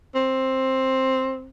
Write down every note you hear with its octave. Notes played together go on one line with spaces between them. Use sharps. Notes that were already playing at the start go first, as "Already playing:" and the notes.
C4